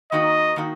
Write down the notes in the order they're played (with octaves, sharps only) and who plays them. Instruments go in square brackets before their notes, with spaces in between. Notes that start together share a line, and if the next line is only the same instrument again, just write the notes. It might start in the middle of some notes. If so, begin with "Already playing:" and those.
[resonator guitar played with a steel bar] D#3 A#3 D#4 F#4 [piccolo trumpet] D#5
[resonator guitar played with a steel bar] D#3 A#3 D#4 F#4